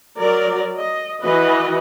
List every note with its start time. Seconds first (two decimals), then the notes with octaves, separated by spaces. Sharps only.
0.19 F#3 A#4 D5
0.77 D#5
1.21 E3 F#4 B4 D#5